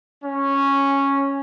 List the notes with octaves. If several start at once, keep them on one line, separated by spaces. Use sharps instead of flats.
C#4